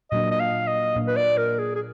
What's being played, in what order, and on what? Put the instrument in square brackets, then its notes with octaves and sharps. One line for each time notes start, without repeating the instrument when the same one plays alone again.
[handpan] A#2 F#3 A#3 D4 [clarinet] D#5
[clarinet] D#5
F5
D#5
[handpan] A#2 F#3 A#3 D4
[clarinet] B4
D5
A#4
G#4
G#4